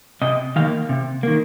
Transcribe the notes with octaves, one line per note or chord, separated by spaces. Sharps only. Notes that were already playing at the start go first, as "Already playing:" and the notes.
C3 D#5
D#3 A#3 F5
C3
D#3 A#3